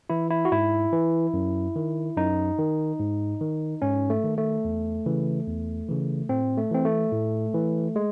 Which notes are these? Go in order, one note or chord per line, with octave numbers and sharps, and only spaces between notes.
E3 E4
E4
F#4
G#2 E4
E3
F#2
D#3
F#2 D#4
D#3
G#2
D#3
G#2 C#4
A3
D#3
A3
E2
C#3 E3
E2
C#3 E3
A2 C4
A3
E3 C4
A3
A2
E3
G#3